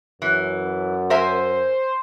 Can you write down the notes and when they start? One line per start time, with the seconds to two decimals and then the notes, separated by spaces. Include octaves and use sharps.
0.22 F#2 E3
1.10 A#4 C5 E5 G#5